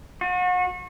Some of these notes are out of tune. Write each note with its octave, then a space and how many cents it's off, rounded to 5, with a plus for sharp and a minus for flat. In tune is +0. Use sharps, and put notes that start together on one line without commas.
F#4 -35